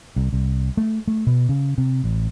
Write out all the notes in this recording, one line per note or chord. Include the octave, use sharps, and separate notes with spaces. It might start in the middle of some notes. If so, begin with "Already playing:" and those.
C2
C2
A3
A3
B2
C#3
C3
A1